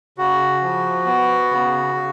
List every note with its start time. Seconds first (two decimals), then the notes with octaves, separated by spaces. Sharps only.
0.18 C#3 F#4
0.62 F3
1.06 B3
1.51 C#3
1.95 C#3